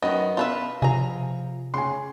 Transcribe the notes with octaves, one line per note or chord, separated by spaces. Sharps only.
F#2 D#3 B3 D#5
B2 F4 B4 E5
C3 F3 G#4 A#5
C#3 G#5 C6